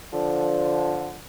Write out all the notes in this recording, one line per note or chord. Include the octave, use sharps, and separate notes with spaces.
D3 F3